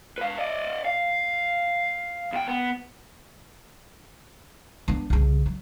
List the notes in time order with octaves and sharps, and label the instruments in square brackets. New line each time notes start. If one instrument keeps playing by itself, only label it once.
[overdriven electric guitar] B4 F5
D5 D#5
F5
E2 G5
B3
[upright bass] B3 D4
C2 C#3
F#3